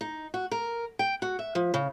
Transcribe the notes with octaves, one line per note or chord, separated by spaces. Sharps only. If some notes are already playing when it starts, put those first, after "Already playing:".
D#4
F#4
A#4
G5
F#4
E5
F3
C#3